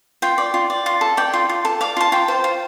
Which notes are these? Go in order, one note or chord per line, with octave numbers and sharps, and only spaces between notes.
F4 G5
D5
F4
D5
F4
A4
D5 G5
F4
F4
A4
D5 F5
F4 A5
F4 G5
C5
F4